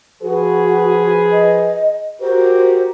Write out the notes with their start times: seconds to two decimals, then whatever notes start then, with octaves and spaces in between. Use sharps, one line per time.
0.22 F3 F#4 G#4 B4
1.32 D#5
2.21 F#4 G4 A#4 C5